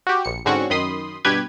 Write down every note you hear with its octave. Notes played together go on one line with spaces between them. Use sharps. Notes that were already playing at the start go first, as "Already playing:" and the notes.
F#4 G4
A#1 C#7
G#2 D3 C4 C#4 F#4 C#6
F#2 D#3 B5 C6 D#6
G2 B2 G4 B4 G#6